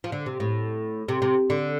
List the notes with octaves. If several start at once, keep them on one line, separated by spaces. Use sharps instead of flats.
F3
D3
C3
A2
C3
C3
D3